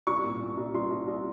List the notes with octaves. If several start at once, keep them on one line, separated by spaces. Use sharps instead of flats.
C2 C#6
A#2
A#2
C2
C2 C6
C2
C2